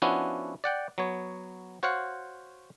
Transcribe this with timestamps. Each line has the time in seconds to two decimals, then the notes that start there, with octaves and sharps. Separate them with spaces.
0.02 F3 B3 C#4 D4 E4 F#4
0.64 D5 F#5 G5
0.98 F#3 B3 C#5
1.83 F#4 C5 C#5 F5 F#5